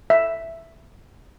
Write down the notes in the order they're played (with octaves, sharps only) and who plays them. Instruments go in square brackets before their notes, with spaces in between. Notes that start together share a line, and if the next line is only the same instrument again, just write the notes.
[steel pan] E5